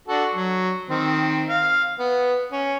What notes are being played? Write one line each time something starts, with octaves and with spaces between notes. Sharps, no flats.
D4 F#4 A4
F#3
D#3 C4
F5
B3
C#4